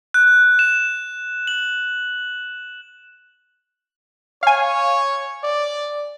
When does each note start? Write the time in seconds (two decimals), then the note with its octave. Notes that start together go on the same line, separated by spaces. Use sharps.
0.14 F#6
0.59 E7
1.47 F#7
4.43 C#5 F5 G#5
5.43 D5